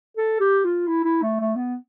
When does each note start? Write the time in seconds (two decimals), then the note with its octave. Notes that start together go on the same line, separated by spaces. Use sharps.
0.17 A4
0.40 G4
0.64 F4
0.88 E4
1.04 E4
1.22 A3
1.40 A3
1.56 B3